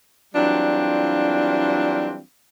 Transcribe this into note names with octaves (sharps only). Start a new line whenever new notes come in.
E3 F#3 G3 C4 D4 F4